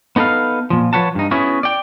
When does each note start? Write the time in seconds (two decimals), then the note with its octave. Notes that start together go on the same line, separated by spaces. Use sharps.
0.16 B3 D#4 A4 B4 F5
0.70 A#2 F3
0.93 F3 B4 C#5 F#5 A5
1.15 G2 D#4
1.31 B3 C#4 E4 F#4 G#4
1.63 D5 G5